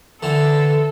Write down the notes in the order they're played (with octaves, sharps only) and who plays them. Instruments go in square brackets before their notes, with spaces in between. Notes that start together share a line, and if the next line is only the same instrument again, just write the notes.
[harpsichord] D3 E3 [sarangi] A4